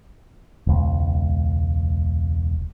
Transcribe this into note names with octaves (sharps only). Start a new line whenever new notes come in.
E1 C#2